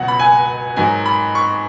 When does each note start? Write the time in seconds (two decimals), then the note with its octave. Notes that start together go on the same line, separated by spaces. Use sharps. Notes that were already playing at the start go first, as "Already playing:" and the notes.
Already playing: C#2 B2 F#3 F#5
0.08 B5
0.19 G#5
0.76 G#2 D#3 F#3 G#5
1.06 B5
1.35 C#6